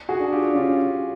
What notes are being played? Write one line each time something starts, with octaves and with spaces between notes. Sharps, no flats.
F#4 G#4
D4
F4 G4
C#4 F4 G4